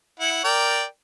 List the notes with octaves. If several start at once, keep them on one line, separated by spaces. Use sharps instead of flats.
E4 F#5
A#4 D5 G5